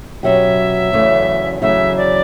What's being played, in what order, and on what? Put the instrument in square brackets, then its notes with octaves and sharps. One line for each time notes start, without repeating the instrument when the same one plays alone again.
[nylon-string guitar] B2 F#3 C#4 G4 [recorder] E5
[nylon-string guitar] E2 C#3 F#3 A3
[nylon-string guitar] E2 C#3 F#3 A3 [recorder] E5
[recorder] D5